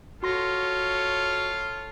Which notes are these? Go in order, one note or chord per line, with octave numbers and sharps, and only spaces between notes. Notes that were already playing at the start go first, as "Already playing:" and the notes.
F4 F#4 A4 C#5 C6 A#6